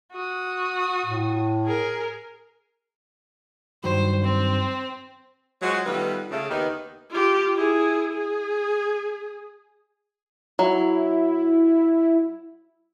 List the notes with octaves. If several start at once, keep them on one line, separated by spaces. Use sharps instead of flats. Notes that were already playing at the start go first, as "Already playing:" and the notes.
F#4 D#6
A2
G#4 A#4
G2 D#3 F#3 C5
C4
F#3 G#3 F4 F#4 C5 C#5
D#3 G3 A3 B3 F4 B4
C#3 A3
D#2 D#3 B3 D#4 G4 B4
F4 G4
E4 G#4
G#4
F#3 E4